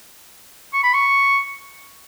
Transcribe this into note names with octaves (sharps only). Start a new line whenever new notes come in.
C#6
B5
C#6